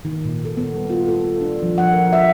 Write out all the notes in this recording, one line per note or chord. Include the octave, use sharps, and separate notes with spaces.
D#3
A#2
A4
B3
G3
F4
A4
D4
F3
F#5
A#4
E5